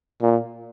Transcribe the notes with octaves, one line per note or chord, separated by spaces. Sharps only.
A#2